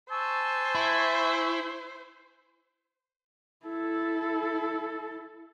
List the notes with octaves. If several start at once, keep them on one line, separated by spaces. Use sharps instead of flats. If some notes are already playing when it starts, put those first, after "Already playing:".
C5 G#5 A5 C#6 E6
E4
E4 A4